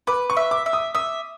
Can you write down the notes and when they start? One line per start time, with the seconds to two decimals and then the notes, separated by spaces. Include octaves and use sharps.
0.07 B4 D6
0.30 C#6
0.37 E5
0.51 D6
0.66 E5
0.73 D#6
0.95 E5 D#6